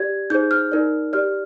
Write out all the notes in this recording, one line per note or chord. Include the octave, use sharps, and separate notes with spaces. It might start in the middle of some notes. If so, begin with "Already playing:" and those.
Already playing: G4 D5 G#6
D#4 G#4 C5 G6
F6
D#4 A#4 D5
G4 D5 F6